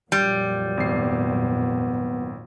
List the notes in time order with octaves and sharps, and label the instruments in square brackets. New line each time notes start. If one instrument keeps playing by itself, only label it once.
[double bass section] F2 A#2 F#3 [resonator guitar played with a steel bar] G3
[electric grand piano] G#1 C7 [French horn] B3